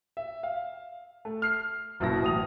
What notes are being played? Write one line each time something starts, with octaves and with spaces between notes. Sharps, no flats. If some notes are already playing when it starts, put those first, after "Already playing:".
E5
F5
A3
F6 C7
F#1 F#2 B2 E4 A5 A#6
A1 D#6 F7